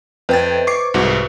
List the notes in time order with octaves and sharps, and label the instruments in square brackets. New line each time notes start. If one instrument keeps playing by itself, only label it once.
[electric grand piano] F2 G5 A6 [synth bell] B4 C5
[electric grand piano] C#6 D6 C7
C2 G#2 F#4